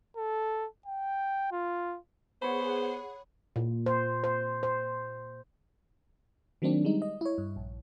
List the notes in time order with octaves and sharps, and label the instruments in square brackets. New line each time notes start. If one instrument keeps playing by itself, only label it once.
[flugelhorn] A4
G5
F4
[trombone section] B3 [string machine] G#4 F#5 [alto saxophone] C5 [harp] C#5 B5
[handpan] A#2
C5
C5
C5
[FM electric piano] D#3 F#3 A#3 C4 D4
G3 G#3 D#4
D#5
E4 C#5
G2
A#1